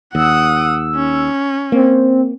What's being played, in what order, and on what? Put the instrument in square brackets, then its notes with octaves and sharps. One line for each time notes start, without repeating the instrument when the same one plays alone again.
[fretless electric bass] D#2 [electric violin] F#5 D#6 [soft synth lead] E6
[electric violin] C#4
[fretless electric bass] A#3 [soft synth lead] C4